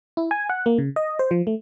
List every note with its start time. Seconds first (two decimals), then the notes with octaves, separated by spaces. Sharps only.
0.17 E4
0.31 G#5
0.49 F#5
0.66 A#3
0.78 C#3
0.96 D#5
1.19 C5
1.31 F3
1.47 A3